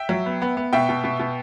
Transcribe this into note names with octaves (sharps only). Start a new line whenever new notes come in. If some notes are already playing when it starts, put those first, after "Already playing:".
Already playing: E5 G5
F#3
B3
B3
B3
B2 E5 G5
B2
B2
B2